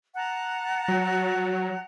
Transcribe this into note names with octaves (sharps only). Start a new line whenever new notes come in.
F#5 A5 A#5
F#3